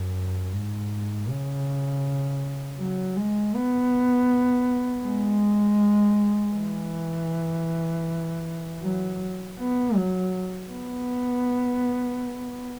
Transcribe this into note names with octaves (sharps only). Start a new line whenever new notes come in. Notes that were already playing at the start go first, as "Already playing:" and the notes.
Already playing: F#2
G#2
C#3
F#3
G#3
B3
G#3
E3
F#3
B3
F#3
B3